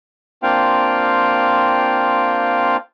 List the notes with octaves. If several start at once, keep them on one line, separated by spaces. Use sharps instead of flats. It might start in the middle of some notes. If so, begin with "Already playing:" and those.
A#3 C4 D4 F4 F5 G5